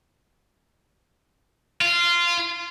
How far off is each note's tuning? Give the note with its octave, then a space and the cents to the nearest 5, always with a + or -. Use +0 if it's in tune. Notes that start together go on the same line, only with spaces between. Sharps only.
F4 -15